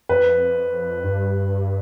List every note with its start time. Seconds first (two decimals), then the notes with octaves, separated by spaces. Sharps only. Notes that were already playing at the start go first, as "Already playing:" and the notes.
0.09 F2 B4
1.04 G2